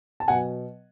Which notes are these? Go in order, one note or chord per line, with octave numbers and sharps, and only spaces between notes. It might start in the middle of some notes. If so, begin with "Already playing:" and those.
A5
B2 F#3 F#5 G#5